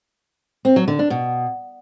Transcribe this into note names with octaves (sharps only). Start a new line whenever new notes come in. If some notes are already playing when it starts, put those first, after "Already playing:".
C4
F#3
D3
D4
B2